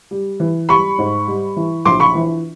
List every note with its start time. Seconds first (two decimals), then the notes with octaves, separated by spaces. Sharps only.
0.11 G3
0.40 E3
0.69 G3 B5 C#6
0.98 G#2
1.28 G3
1.57 E3
1.85 A#1 C6 D6
2.00 B5 C#6
2.15 E3